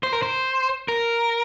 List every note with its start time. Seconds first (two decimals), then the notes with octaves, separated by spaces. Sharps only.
0.03 C5
0.13 A#4
0.23 C5
0.88 A#4